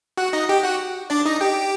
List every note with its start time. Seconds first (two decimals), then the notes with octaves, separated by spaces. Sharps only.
0.18 F#4 F#5
0.33 D#4 D#5
0.49 G4 G5
0.63 F#4 F#5
1.10 D4 D5
1.25 D#4 D#5
1.41 G4 G5